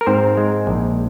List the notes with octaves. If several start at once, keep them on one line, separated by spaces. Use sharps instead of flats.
A#4
G#2 C4 C5
G#3
A#1